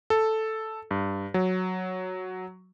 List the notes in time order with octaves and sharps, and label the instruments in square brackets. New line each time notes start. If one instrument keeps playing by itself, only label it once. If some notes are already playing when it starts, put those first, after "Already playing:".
[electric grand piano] A4
G2
F#3